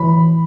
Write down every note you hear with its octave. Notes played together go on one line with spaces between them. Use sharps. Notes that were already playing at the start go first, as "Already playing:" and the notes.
Already playing: E3 B5